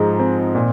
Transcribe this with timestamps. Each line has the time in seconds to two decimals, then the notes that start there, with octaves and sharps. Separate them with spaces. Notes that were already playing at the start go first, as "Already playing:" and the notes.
Already playing: G#2 F3 G#3 A#5
0.19 C4
0.55 A#2